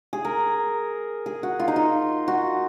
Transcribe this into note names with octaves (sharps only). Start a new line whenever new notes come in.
G#4
A#4
G#4
F#4
F4
D#4
F4
F#4